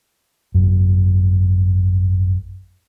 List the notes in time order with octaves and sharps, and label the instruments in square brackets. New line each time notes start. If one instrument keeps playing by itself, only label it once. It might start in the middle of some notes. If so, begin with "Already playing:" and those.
[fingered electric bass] G#1 F#2